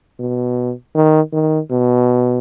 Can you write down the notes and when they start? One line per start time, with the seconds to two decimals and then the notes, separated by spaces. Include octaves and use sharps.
0.19 B2
0.94 D#3
1.33 D#3
1.71 B2